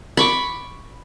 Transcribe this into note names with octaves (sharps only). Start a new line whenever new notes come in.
B5 C#6 D6